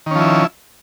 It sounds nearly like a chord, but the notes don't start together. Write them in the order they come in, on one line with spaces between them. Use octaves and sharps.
D#3 C#4 F3 E4